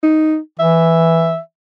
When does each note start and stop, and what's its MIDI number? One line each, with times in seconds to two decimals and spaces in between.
0.03 0.37 63
0.60 1.37 52
0.60 1.38 76